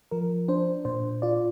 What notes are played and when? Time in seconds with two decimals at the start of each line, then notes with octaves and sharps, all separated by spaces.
0.11 F3 A#4
0.48 D4 C5
0.85 A#2 C5
1.22 F4 D5